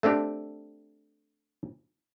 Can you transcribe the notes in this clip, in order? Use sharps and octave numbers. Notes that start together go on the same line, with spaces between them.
A3 C4 D4 G4